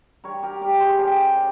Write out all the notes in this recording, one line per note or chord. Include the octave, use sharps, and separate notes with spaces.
G3 A#4 C#5
G4 A#4
G3 G4 A#4
G#4 C5
C#3 G4 A#4
C#3